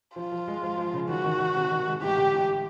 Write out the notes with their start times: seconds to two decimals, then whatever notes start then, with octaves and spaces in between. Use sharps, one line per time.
0.16 F3 F4
0.32 F3
0.47 G#3
0.63 F3
0.77 F3
0.93 C#3
1.09 D#3 F#4
1.25 D#3
1.39 D#3
1.55 C3
1.72 D#3
1.87 G#3
2.01 A1 G4
2.18 D3
2.33 A1